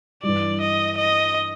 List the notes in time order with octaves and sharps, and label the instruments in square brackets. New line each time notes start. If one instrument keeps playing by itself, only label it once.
[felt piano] G2 E3 G3 [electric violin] D5
[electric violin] D#5
D#5